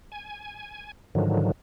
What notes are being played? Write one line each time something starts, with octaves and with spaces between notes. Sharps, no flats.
G#5
G#2 D3 D#3 F3 F#3